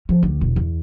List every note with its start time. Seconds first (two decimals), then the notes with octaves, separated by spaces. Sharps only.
0.09 F3
0.23 D2
0.41 E1
0.56 E2